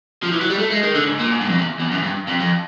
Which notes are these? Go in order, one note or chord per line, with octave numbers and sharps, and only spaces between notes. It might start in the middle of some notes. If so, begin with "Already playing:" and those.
F3
E3
F#3
G3
A3
G#3
D#3
D3
G#2
A#2
G#2
G2
F2
E2
E2
F#2
G2
F2
F2